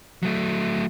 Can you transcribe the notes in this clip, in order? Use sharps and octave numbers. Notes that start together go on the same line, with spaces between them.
F#3 A3